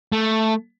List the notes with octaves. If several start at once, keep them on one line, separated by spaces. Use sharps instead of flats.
A3